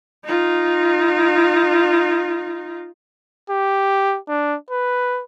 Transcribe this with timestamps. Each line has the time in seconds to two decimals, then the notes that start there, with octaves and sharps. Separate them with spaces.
0.24 D#4 F4
3.50 G4
4.28 D4
4.70 B4